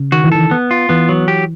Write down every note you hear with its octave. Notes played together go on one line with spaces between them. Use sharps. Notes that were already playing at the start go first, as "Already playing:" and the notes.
Already playing: C#3
D#3 F#4
E3
D#3 A4
B3
F4
E3 B3
F#3
G4